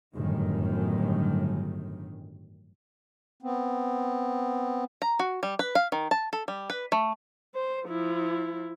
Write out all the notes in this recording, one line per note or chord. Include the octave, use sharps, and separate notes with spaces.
G1 F#2 A2 D#3
B3 C4
A#5
F#4
G3
B4
F5
D#3
A5
A4
G3
B4
A3
C5
F3 E4